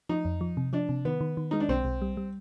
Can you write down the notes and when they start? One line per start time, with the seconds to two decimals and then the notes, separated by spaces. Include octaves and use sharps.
0.09 F3 D#4
0.25 F2
0.41 F3
0.57 C3
0.73 F3 D4
0.89 C3
1.05 D#3 B3
1.21 D#3
1.37 D#3
1.51 G#3 D#4
1.60 D4
1.69 B1 C4
1.85 B1
2.02 G3
2.17 G3